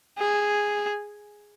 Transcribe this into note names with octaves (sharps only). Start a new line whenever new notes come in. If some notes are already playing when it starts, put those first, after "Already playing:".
G#4